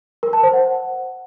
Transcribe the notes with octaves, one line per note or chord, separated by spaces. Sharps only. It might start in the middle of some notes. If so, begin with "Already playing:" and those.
A#4
A5
C5
F#5